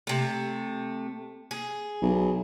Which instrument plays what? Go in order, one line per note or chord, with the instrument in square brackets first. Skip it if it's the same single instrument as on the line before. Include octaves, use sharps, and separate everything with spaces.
[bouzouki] C3 A3
G#4
[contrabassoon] B1